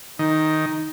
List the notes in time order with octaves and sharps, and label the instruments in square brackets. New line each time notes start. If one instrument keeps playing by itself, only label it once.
[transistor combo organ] D#3 [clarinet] D#4